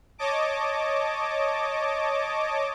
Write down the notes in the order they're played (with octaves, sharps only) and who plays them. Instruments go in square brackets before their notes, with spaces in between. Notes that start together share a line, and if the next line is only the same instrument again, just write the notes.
[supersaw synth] C#5 D#5 A5 D6